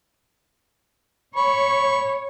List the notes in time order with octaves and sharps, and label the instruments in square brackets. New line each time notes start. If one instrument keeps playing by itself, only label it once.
[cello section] C#5 [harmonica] B5 C#6